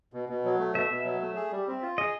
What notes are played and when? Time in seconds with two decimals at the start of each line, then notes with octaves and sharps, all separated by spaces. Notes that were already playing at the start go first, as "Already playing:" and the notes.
0.13 B2
0.29 B2
0.45 F#3
0.60 A3
0.74 B2 E5
0.90 B2
1.05 F#3
1.22 A3
1.36 G#4
1.52 G3
1.67 C4
1.82 F4
1.98 G#4 D#5